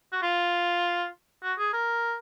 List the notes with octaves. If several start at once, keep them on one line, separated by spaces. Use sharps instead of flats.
F#4
F4
F#4
G#4
A#4